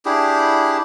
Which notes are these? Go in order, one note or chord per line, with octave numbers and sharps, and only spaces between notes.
D4 E4 G4 G#4